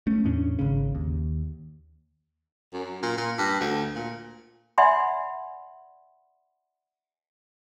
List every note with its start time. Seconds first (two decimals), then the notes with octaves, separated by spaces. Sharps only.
0.07 A3 C#4
0.24 E2 A2 C#4 D4
0.59 G#1 C#3
0.95 D#2
2.73 F#2
3.03 A#2
3.18 A#2
3.38 G2
3.60 D2
3.96 A#2
4.78 D5 E5 F#5 G#5 B5 C6